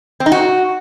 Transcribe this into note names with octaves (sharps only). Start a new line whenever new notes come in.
C4
D#4
F#4